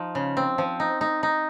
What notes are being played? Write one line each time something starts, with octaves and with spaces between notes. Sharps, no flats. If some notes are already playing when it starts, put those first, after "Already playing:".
Already playing: F3 D#4
C#3
C4
F3
D#4
D#4
D#4